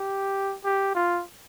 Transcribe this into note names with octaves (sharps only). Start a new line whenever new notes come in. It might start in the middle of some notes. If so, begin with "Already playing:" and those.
Already playing: G4
G4
F4